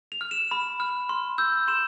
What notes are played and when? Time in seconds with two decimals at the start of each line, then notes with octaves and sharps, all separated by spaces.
0.12 F7
0.21 F6
0.31 E7
0.51 B5
0.80 F6
1.09 C6
1.38 E6 G6
1.68 C6 E7